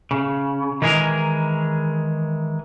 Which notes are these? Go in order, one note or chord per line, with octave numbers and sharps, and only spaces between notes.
C#3
D#3 E3 G#3 G#4 A#4